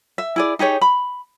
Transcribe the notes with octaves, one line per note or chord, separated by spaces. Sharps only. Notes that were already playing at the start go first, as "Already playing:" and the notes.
E5
E4 G#4 D5
D#4 G4 G#4 C#5
B5